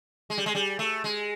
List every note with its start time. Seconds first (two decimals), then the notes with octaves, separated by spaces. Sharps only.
0.30 G#3
0.38 G3
0.46 G#3
0.55 G3
0.79 A3
1.04 G#3